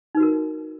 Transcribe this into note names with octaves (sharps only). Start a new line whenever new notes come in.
D#4 F#4 A#4 B4